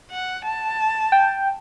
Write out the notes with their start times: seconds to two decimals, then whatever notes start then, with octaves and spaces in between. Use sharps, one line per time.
0.11 F#5
0.45 A5
1.12 G5